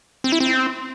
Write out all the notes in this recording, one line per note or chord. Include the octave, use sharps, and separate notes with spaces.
C4
E4
C4